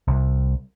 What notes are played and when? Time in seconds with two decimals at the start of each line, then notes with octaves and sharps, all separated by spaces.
0.08 C2